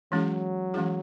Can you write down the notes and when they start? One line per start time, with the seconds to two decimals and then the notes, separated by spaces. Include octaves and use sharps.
0.12 E3 F#3 G#3 C#4 E4 G#4
0.74 E3 G#3 C#4 E4 G#4